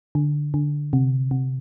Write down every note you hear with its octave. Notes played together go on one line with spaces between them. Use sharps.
D3
D3
C3
C3